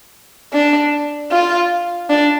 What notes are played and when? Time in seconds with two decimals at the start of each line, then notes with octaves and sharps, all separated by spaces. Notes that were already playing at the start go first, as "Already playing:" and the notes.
0.53 D4
1.31 F4
2.10 D4